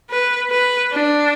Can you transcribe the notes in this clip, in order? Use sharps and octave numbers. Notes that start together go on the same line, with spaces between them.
B4
B4
D4